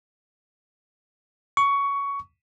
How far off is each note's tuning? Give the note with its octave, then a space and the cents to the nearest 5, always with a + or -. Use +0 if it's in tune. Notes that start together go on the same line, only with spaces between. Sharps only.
C#6 +15